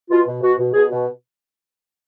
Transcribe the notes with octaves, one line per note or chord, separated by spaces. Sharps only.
B2 F4
B2
B2 F#4
B2
B2 G#4
B2